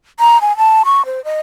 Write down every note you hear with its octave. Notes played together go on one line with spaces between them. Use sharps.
A#5
G#5
A5
C#6
C5
D#5